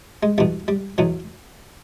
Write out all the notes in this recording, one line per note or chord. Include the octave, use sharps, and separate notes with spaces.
G#3
E2 B2 G3
G3
E2 B2 F#3